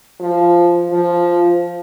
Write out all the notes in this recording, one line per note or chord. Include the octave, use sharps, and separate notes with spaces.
F3
F3